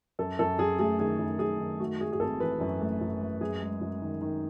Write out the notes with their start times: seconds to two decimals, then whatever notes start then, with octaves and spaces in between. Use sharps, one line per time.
0.19 F#2 A4
0.39 F#2 A4
0.59 F#2 G#4
0.79 A3 G#4
0.99 D#3 G#4
1.19 F#2
1.39 F#2 G#4
1.59 D#3
1.80 A3 F#4
2.00 A3 G#4
2.12 G#4
2.20 G#1 A4
2.40 E3 B4
2.61 F#2
2.81 A3
3.01 F#2
3.21 A3
3.41 F#2 G#4
3.61 G#3
3.81 F#2
4.02 D#3
4.21 D#3